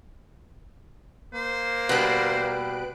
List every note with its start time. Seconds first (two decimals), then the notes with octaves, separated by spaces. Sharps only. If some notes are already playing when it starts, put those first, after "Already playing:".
1.34 A#3 C5
1.89 B2 G3 B4 F#6 D7